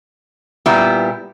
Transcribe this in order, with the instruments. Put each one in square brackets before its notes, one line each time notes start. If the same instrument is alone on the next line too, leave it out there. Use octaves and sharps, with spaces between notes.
[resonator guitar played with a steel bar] A#2 G3 B3 E4